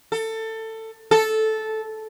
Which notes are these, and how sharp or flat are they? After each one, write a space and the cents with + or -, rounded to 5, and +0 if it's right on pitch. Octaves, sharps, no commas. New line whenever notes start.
A4 +20
A4 -10